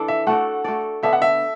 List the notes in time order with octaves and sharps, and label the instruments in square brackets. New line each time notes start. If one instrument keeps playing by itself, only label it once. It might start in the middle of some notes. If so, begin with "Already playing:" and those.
Already playing: [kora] E3 D4 A4 D5
[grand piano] E5
[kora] A3 F#4 A4 D5 [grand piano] F#5
[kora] A3 F#4 A4 D5
[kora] D3 B3 D4 [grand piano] E5
[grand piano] F#5
E5